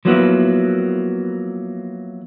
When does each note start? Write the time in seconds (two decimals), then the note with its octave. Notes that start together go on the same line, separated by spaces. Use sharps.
0.05 F3 F#3 A#3 B3 E4 B4